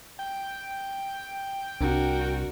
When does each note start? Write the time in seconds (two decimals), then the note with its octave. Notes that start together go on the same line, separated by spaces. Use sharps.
0.19 G5
1.81 C2 D4 F#4 A#4